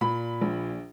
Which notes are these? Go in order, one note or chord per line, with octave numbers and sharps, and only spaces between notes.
A#2 B5
A#1